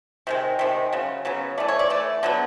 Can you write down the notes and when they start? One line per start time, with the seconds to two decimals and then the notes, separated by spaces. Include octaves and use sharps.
0.27 C3 D#3 G#3
0.59 C3 D#3 G#3
0.93 C#3 F#3
1.25 C#3 F#3 B3
1.58 E3 A3 D5
1.68 C#5
1.79 D5
1.90 E3 A3 D5
2.23 D3 F#3 B3